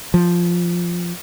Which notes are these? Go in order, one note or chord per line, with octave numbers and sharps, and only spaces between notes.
F3